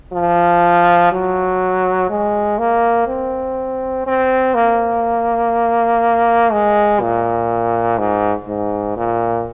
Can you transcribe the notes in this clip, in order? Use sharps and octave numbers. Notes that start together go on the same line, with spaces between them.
F3
F#3
G#3
A#3
C4
C4
A#3
G#3
A#2
G#2
G#2
A#2